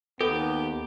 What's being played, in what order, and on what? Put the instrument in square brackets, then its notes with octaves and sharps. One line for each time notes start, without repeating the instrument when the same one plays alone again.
[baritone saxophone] D#2 [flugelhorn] B3 [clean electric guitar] G4 [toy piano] A4